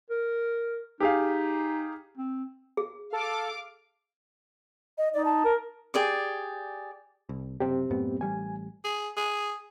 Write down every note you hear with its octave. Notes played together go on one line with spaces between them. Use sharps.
A#4
D#4 G4 G#4 F5
C4
G#4
A4 F5 D6
D#5
D#4 D5
A5
A#4
G4 G#4 D5 D6
C2
F#1 C3 C4 G4
F#2 A2 B3
A1 G3 G#5
G#4
G#4